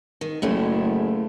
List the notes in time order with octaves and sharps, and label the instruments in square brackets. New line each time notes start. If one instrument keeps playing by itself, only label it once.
[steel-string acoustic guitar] D#3
[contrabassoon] F#1 [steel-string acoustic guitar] F#2 A2 A3